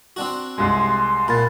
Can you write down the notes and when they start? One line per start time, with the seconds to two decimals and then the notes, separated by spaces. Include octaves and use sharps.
0.16 C4 D4 F#4
0.58 C2 G#3 C6
1.28 A#2 B5 A6